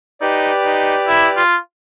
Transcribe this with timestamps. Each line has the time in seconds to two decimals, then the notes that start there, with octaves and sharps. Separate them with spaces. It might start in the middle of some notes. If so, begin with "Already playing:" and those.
0.21 D#4 G4 B4 D5
0.65 D#4
1.07 E4
1.37 F4